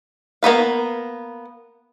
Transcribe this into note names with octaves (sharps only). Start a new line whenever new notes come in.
A#3 B3 B4 F5